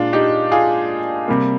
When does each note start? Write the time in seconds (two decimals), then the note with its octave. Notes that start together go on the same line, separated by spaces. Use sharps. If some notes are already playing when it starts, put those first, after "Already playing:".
Already playing: A#2 G#3 D4 F4
0.13 D#4 G4
0.52 F4 G#4
1.28 C3 G3 A#3